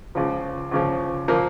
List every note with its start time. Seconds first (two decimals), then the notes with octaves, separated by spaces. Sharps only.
0.15 C#2 C#3 F3
0.71 C#2 C#3 F3
1.28 A#2 F3 A#3